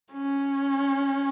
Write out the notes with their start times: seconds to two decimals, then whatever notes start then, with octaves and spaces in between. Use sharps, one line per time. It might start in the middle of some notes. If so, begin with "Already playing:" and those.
0.13 C#4